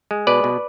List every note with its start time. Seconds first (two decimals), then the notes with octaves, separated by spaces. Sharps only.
0.11 G#3
0.27 B2 B4 D5
0.44 B2